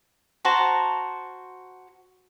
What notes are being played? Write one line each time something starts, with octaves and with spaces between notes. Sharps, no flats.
F#4 C5 A5 A#5